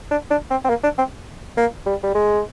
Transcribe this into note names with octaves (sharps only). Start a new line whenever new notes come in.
D4
D4
C4
C4
A#3
D4
C4
A#3
G3
G3
G#3